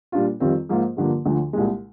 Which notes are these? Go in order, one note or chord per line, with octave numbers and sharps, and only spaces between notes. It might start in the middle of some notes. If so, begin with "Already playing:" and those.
A#2 G3 D4 F4
F2 D#3 G3 C4 F4
G#2 F3 A#3 F4 C5
G2 D3 F3 A#3
D2 D3 F3
C2 A#2 G#3